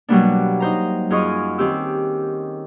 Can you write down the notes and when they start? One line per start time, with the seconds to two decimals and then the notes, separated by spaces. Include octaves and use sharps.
0.09 B2 F#3 G3 A#3 B3 D4
0.60 D#4 C5 A#5
1.10 F#2 F4 G#4 D#5 C#6
1.58 D#3 C4 C#4 G4 E6